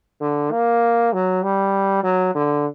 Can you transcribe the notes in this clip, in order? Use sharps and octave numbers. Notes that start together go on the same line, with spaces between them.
D3
A#3
F#3
G3
F#3
D3